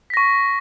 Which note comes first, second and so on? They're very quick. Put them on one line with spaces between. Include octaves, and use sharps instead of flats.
B6 A#6 C#6